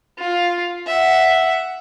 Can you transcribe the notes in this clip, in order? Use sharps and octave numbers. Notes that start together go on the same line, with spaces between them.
F4
E5 F#5